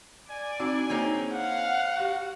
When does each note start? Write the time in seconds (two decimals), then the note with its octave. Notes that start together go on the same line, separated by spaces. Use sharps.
0.29 D5 G#5
0.59 C4 D4 D#4 F#4 G#5
0.90 A#3 C4 C#4 D#4 G#4
1.33 F5 F#5
1.97 F#4 G4 F5